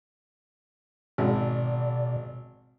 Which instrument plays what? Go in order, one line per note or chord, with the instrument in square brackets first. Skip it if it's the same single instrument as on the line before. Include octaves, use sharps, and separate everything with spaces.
[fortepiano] G#1 [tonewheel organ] B2 D5